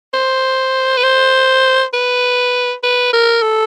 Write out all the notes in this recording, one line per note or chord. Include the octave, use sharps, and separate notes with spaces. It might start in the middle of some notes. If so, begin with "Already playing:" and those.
C5
B4
C5
B4
B4
A#4
A4